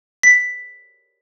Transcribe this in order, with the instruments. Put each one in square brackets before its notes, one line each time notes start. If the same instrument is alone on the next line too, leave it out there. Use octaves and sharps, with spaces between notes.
[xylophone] B6